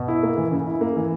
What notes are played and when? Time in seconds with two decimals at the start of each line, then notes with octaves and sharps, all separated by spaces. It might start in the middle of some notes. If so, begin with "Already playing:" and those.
Already playing: B2
0.08 E4
0.23 A#3
0.37 E3
0.51 C#3
0.67 E4
0.81 A#3
0.96 E3